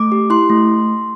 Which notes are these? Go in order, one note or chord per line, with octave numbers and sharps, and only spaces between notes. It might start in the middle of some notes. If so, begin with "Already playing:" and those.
Already playing: A3 D6
G4
E4 C6
A3